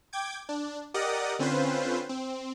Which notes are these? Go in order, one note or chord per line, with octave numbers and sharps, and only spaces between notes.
G5 D6 G#6
D4
G4 A#4 D5 D#5 F#5 D#6
D3 C4 C#4 F4 B4 C5
C4